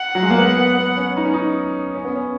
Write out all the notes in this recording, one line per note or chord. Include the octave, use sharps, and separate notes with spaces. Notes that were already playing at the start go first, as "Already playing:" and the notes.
Already playing: F#5
F#3
G#3
A#3
B3
B3
B3
C#4
D#4
C#4
D#4
C#4
B3
C#4